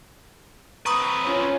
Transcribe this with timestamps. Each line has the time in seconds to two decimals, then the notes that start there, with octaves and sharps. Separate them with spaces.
0.86 C4 B4 A#5 C#6 D#6
1.25 C#4 F4